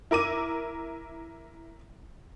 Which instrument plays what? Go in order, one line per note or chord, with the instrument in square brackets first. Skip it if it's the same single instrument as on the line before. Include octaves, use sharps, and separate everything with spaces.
[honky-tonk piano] E4 A#4 D6 D#7